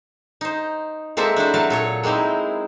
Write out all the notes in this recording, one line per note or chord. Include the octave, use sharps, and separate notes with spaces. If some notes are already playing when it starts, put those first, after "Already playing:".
D#4 C5
G#3 A#3 C4 A4 C5 E5
D4 E4 F#4 C5
F#3 A3 F5 A5
A#2 A4 C#5
G#3 A#3 C4 D#4 E4